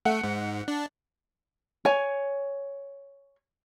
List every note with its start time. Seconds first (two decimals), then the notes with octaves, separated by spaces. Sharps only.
0.05 A3 F#5
0.24 G#2
0.68 D4
1.85 C#5 G#5